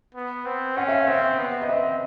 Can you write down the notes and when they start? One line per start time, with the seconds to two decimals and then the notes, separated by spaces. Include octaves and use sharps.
0.15 B3
0.46 C4
0.77 C#4 F#5
0.88 E5
0.92 F5
1.08 C4 E5
1.39 B3
1.62 D#5
1.69 C4 E5